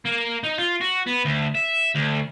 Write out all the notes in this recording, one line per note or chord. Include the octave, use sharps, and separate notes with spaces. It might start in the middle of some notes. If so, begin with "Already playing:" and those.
A#3
D#4
F4
F#4
B3
D2
E5
D2